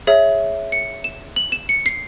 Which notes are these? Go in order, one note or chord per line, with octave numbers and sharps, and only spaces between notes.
G#4 C#5 E5
C#7
E7
F#7
E7
C#7
C7